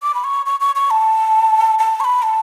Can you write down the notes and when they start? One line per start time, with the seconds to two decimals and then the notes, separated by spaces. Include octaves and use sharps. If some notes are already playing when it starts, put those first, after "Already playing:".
0.03 D6
0.14 B5
0.24 C#6
0.46 C#6
0.60 C#6
0.76 C#6
0.91 A5
1.79 A5
2.00 C#6
2.04 B5
2.22 A5